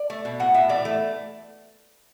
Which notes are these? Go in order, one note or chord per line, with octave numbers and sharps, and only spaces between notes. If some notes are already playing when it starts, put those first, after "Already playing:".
Already playing: D5
A3
B2
A2 F#5
A2 E5
E3 D5
A3